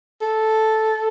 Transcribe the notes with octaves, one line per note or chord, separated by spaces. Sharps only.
A4